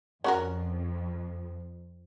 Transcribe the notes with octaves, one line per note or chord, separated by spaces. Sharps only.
F2 C#4 F#4 A#4